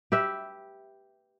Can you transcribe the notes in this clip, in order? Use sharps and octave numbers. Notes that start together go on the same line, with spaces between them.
G4 B4 E5